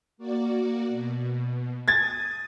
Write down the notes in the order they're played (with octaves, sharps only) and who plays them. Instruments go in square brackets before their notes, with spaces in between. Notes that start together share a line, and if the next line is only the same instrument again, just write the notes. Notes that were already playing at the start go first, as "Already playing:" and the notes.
[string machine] A#3 F#4 D5
B2
[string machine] D#6 [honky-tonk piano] G#6 A6